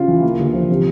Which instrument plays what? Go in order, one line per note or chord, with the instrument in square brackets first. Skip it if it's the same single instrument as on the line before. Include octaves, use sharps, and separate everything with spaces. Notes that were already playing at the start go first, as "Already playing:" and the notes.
Already playing: [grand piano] C#3 F4
E3
A#3
D3
F3
C3